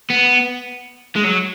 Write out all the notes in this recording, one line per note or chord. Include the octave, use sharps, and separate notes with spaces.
B3
G#3
F#3